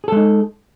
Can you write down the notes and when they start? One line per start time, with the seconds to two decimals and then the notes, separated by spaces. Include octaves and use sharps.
0.04 G#4
0.08 A4
0.12 G#3
0.16 D#4